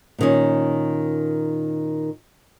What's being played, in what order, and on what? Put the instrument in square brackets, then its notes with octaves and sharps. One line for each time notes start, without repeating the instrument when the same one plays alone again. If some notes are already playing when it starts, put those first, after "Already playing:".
[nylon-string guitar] A#2 D#3 C#4